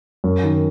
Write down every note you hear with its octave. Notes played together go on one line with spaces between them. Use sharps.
F#2
D#3